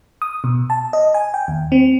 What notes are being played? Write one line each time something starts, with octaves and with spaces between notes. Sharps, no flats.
D#6
B2
A5
D#5
G#5
G5
D#2
C4